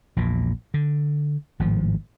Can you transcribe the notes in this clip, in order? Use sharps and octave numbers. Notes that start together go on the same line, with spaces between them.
A#1 E2 A#2
D3
G#1 A2 F3